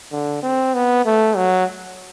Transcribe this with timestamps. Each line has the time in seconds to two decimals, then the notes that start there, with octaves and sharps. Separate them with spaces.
0.12 D3
0.43 C4
0.74 B3
1.05 A3
1.36 F#3